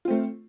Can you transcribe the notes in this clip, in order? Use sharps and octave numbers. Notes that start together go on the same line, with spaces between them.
A3 C4 F4